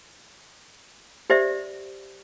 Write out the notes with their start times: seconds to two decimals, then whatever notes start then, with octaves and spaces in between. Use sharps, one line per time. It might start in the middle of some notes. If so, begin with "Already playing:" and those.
1.30 G4 C5 D5 E5